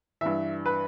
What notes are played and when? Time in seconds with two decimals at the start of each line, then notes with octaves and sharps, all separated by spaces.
0.21 G2 E3 E5
0.66 B4